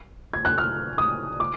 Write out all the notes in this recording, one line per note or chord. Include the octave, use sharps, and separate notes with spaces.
G#6
F#6
F6
D#6
D6